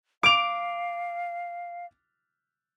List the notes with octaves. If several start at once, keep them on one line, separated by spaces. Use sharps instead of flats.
F5 D6 D7 F7